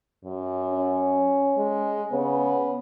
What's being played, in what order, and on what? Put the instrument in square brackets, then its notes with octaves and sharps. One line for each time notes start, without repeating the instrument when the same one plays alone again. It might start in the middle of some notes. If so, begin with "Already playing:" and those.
[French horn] F#2
[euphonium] C#4
[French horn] G#3
[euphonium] C#3 [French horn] B3